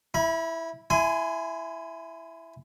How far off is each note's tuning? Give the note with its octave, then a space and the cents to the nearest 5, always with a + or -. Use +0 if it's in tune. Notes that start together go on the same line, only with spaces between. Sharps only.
E4 +0 B5 -35
E4 +5 G#5 +10 C6 -35